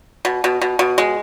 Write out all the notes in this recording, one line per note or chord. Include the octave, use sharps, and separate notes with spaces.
B2
B2
B2
B2
G#3